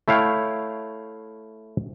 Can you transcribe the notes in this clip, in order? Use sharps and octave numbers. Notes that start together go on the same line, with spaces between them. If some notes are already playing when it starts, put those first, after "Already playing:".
A3 E4 C#5 F5 G5